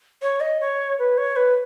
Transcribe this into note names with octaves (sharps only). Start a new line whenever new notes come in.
C#5
D#5
C#5
B4
C#5
B4